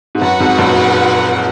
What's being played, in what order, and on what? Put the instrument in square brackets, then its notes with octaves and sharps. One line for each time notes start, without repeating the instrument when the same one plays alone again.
[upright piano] G#2
[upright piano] F#2 [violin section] F#4 B4 F#5
[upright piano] F2 G#2
F#2 A#2